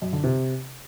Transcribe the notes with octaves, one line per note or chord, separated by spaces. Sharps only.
F#2
D3
C3